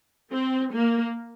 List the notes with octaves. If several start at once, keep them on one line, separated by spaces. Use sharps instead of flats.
C4
A#3